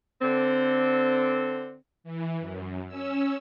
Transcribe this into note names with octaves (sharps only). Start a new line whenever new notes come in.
D3 C4
E3
F#2
C#4 E6